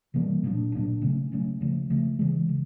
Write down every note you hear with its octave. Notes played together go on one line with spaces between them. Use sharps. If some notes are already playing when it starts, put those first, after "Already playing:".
C3 E3 G3 A#3
A#2 F#3 A#3 D4
A#2 F#3 A#3 D4
C#3 F#3 A3 C#4
C#3 F#3 A3 C#4
C#3 F3 A3
C#3 F3 A3
C#3 E3 G#3
C#3